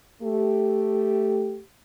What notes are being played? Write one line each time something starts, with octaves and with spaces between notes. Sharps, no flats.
A3 G4